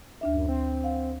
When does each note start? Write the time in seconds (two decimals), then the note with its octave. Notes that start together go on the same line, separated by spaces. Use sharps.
0.21 D2 D4 E5
0.33 F#2
0.48 C4
0.84 F5 F#5